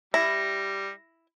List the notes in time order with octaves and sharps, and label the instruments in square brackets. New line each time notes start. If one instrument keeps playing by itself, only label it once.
[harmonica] G3 [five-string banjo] E4 [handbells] A#6